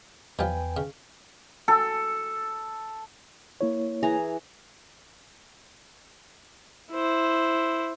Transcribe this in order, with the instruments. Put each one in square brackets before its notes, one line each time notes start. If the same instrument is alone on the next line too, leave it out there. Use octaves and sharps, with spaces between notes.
[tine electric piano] E2 [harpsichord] F3 G3 [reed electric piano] B4 G5 G#5
[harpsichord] C#3
[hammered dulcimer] A4
[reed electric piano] A#3 E4 C#5
[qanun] E3 G#4 A#5
[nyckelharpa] E4 C5